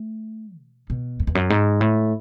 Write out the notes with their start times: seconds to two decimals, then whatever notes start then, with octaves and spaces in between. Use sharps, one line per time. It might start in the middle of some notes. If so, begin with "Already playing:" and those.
Already playing: A3
0.60 B2
0.90 B2
1.20 F#2
1.27 E2
1.35 F#2
1.50 G#2
1.81 A2